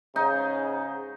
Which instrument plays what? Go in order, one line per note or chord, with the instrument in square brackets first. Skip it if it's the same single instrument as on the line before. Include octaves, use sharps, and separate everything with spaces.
[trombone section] G#2 C#3 [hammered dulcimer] D#4